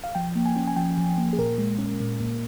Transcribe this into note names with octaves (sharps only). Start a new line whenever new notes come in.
F5
F3 G5
A#3
G#5
C#4
G#5
F3 G5
F3
A#3
G#4
A#2 A#4
G#3
C#4
A#2
A#2